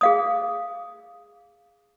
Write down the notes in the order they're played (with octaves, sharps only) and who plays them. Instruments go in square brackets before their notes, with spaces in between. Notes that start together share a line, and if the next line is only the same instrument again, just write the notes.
[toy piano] G#4 F5 D#6